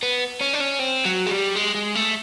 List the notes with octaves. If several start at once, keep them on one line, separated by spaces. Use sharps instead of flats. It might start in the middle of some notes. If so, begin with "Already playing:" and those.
B3
C#4
D4
C#4
C4
F#3
G#3
G3
G#3
G#3
A3